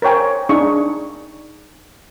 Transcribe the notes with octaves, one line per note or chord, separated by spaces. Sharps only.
A#4 C5 C#5 G5 G#5
D4 D#4 G#4 C#6